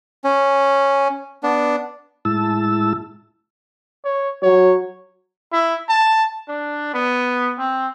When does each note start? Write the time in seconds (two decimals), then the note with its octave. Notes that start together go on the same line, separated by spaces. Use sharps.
0.24 C#4
1.43 B3 D4
2.25 A2 G#3 E4 A5 E6
4.05 C#5
4.43 F#3 C#5
5.53 E4
5.89 A5
6.48 D4
6.94 B3
7.58 C4